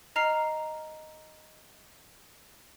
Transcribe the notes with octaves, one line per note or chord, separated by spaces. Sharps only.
D#5 A#5 F6 C7